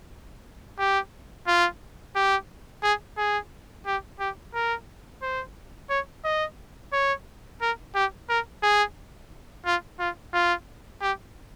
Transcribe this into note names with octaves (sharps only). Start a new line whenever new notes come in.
G4
F4
G4
G#4
G#4
G4
G4
A#4
C5
C#5
D#5
C#5
A#4
G4
A#4
G#4
F4
F4
F4
G4